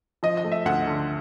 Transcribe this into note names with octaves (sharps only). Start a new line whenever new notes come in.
F3 D#5
D#5
A3
E5
D2 F#5
D3